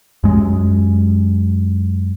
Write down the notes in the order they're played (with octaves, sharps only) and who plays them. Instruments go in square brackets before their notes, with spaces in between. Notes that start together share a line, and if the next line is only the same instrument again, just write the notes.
[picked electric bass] F#2 G#3